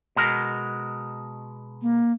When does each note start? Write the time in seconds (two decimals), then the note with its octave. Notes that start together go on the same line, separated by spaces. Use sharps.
0.16 B2 G#3 A#4
1.81 A#3